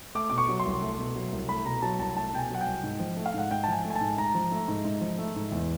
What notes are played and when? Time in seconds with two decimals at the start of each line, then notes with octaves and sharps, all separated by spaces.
0.15 A3 D6
0.30 B2 D6
0.38 C#6
0.49 F#3
0.59 C6
0.65 C2
0.81 A3
0.99 B2
1.15 F#3
1.32 C2
1.48 A3 B5
1.65 B2 A#5
1.82 F#3 A5
1.99 C2 A5
2.16 A3 A5
2.33 B2 G5
2.39 G#5
2.50 F#3 F#5
2.61 G5
2.66 C2
2.83 G#2
3.00 F3
3.17 A3
3.26 F5
3.34 G#2 F#5
3.51 G#2 G5
3.64 A5
3.68 F3 G#5
3.85 A3
3.90 G#5
3.96 A5
4.01 G#2
4.18 G#2 A#5
4.35 F3
4.52 A3
4.68 G#2
4.85 G#2
5.01 F3
5.18 A3
5.36 G#2
5.52 E2